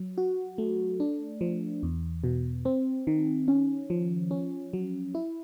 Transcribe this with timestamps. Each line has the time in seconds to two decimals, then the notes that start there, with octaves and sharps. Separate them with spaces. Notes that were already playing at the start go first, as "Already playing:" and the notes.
Already playing: F#3
0.18 F#4
0.58 A3
1.00 D4
1.41 F3
1.83 E2
2.24 B2
2.65 C4
3.07 D#3
3.48 C#4
3.90 F3
4.31 C#4
4.73 F#3
5.15 E4